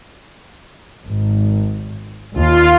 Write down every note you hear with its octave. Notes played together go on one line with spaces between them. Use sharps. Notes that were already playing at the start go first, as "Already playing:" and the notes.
G#1
D#2 F4